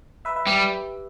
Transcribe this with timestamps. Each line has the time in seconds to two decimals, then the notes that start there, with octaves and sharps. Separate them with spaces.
0.25 B4 E5
0.36 B4 E5
0.47 G3 G4 B4